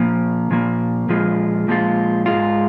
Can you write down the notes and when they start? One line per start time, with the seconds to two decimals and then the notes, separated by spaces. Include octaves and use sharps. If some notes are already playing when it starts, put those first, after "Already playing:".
Already playing: A#2 F3 A#3
0.51 A#2 F3 A#3
1.09 A#2 F3 G#3 F4
1.68 A#2 F3 G#3 F4
2.26 G#2 G#3 F4